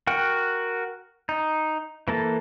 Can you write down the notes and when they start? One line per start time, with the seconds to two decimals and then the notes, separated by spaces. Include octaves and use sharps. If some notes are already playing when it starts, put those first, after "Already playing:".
0.07 F#4 A#4 F#5 G5
1.29 D#4
2.08 E3 A#3 A4